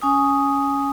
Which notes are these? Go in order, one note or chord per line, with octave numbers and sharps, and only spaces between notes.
C#4 G#5 D#6